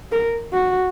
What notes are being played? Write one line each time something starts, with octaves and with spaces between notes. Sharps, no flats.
A#4
F#4